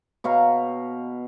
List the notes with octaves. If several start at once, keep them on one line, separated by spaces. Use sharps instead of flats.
B2 C#5 F5 A#5